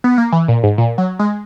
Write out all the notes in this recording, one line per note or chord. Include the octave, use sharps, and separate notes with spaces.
B3
A#3
E3
A#2
G#2
A#2
F#3
G#3